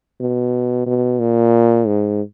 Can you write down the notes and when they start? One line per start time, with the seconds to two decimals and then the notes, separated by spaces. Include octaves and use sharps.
0.20 B2
0.86 B2
1.19 A#2
1.87 G#2